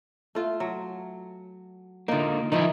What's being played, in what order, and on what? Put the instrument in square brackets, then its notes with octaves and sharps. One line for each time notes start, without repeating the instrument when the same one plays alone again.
[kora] A3 F4
F#3
[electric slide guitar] D3 A#3 [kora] D#4 F4
[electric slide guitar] D#3 F3 E4 [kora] D#4 D#5 E5